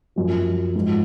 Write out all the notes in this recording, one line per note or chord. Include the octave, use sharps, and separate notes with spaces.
F#2 F3
G#2 F3